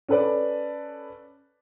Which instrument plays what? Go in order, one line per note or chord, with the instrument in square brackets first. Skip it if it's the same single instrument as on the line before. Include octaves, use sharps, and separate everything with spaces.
[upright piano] C#4 A4 B4 D5